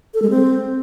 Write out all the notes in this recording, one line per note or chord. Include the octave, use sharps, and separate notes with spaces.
A4
G#3
C4